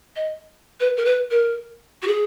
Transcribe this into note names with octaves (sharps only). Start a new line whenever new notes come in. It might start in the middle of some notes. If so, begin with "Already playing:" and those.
D#5
B4
A#4
B4
A#4
F#4
G#4